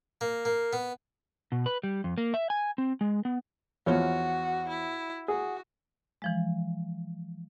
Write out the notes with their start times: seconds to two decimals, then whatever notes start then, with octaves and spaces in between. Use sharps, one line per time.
0.21 A#3
0.45 A#3
0.73 B3
1.52 B2
1.66 B4
1.83 G3
2.04 F2
2.18 A#3
2.34 E5
2.50 G#5
2.78 C4
3.01 G#3
3.25 B3
3.86 E2 F3 F#4 C#5
4.69 E4
5.28 F#4 G#4
6.22 E3 F3 G#3